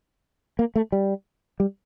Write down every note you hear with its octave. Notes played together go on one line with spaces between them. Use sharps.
A#3
A3
G3
G3